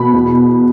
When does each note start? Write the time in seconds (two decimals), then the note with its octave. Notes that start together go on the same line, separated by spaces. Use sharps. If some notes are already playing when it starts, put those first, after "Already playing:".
Already playing: B2 B5
0.14 E2